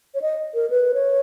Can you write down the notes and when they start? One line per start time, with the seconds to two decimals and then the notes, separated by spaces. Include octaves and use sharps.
0.15 C#5
0.22 D#5
0.54 A#4
0.70 B4
0.94 C#5